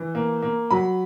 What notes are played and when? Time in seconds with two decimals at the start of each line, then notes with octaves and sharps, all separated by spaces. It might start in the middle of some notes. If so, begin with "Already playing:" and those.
Already playing: E3
0.15 A#3
0.42 A#3
0.71 F#3 B5